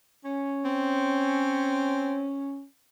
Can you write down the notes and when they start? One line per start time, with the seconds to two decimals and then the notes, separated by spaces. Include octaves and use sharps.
0.23 C#4
0.65 C4